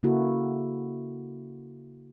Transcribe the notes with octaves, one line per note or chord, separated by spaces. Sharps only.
C#3 A#3 E4 F#4 A4